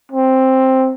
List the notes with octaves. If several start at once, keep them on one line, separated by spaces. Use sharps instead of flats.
C4